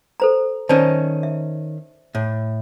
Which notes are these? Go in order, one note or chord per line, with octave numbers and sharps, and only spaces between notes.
A4 C5 A#5
D#3 C#4 C5 D5 A5
E5
A2